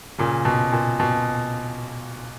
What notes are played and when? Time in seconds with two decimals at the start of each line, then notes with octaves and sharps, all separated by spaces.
0.18 A#2 C#3
0.45 B2
0.72 A#2
1.00 B2